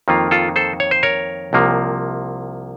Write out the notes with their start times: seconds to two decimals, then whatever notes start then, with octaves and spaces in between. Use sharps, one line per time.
0.08 F2 D#3 A#3 F4
0.31 F4 A4
0.56 A4 C5
0.80 C#5
0.91 C5
1.03 A#4 C#5
1.53 C2 C3 F3 A#3